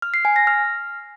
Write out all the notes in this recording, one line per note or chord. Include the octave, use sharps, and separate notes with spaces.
F6
C7
G#5
A#6
F6